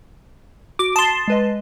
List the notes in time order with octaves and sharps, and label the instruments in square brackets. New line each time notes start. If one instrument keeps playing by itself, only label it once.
[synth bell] F#4 [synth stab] D6
[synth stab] A5 C6 [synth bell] D#6
[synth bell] G#3 B4 D#5